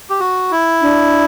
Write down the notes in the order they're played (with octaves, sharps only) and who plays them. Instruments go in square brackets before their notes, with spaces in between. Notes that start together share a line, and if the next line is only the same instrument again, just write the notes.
[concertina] G4
F#4
E4
[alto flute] D4